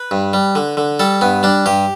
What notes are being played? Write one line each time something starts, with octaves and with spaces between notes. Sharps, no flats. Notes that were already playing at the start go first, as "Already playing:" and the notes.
Already playing: B4
G2
G3
D3
D3
G3 A4
G2 B3
G3 D4
G2 G4